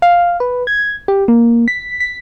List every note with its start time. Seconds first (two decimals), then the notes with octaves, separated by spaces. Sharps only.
0.02 F5
0.40 B4
0.67 G#6
1.08 G4
1.28 A#3
1.68 B6
2.00 B6